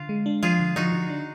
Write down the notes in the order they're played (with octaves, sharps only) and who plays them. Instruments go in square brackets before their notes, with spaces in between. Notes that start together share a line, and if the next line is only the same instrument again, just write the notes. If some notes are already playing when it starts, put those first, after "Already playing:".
Already playing: [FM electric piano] D3 [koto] F4
[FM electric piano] G#3
D4
[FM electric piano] F3 [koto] F4 G#4
[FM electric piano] D3
[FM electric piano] F3 [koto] D#4 F#4
[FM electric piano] D3
D4